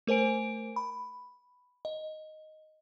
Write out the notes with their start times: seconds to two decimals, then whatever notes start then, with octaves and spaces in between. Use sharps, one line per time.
0.07 A3 A#4 C5 G#5 D7
0.76 B5
1.85 D#5